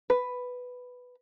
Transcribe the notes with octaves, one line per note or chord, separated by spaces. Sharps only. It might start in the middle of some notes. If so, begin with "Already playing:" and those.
B4